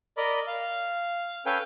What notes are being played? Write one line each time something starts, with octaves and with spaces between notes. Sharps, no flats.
A#4 D5 D#5 B5
F5
C#4 A4 B4 F5 G5 G#5